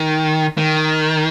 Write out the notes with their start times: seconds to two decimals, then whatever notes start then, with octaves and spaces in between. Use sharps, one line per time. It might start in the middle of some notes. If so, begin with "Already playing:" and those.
Already playing: D#3
0.58 D#3